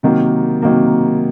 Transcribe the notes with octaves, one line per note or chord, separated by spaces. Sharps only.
C3 D#3 F#3 A#3
C3 D#3 F#3 A#3